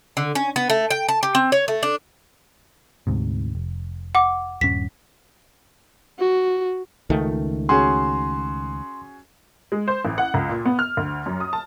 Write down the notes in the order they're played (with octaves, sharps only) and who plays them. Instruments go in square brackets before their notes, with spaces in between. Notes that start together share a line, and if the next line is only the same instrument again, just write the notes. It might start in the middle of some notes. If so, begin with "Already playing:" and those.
[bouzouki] D3
C#4
B3
A3
G5
A5
G4
C4
C#5
A3
D4
[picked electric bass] D2 G#2 C3
F1
[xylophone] F#5 D6
[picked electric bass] D#1 G2 C#4 [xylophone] B6
[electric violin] F#4
[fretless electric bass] C#2 D#3 A3
[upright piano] C#4 F#4 G#4 [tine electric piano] C6
[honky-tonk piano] G#3
C5
A1
F#5
C#2
A#2
B3
F6
D2
F#2
D#6
A5